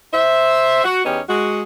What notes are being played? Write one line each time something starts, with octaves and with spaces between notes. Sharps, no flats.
C5 E5
F#4
E2 B3 C#4 D#4 G4 D#5
G#3 F#4